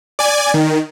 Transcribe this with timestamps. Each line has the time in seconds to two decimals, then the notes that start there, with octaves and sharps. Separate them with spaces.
0.19 D5 G#5
0.54 D#3